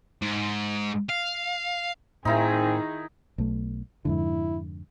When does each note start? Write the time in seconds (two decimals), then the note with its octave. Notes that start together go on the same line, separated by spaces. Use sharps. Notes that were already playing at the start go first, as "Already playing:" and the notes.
0.22 G#2
1.09 F5
2.25 A2 D#3 C4 D#4 E4 G#4 G#5 A#5
3.38 B1 A3
4.05 F2 G#2 D3 E4